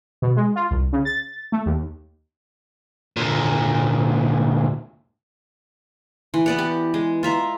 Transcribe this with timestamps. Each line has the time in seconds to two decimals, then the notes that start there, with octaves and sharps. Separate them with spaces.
0.22 B2
0.37 G#3
0.56 F4
0.71 C2
0.93 C#3
1.05 A6
1.52 A3
1.66 D#2
3.17 D2 A#2
6.34 E3
6.46 B3 D5 F#5
6.58 G4
6.94 G#3
7.23 F4 E5 A#5